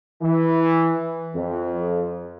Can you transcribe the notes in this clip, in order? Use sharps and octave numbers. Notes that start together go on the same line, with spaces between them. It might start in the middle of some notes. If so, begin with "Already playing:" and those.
E3
F2